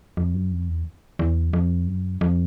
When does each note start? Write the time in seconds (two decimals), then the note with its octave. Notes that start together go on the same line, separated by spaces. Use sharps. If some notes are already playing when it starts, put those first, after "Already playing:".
0.17 F2
0.34 F#2
0.52 F2
0.68 E2
1.19 E2
1.53 F2
1.87 F#2
2.21 F2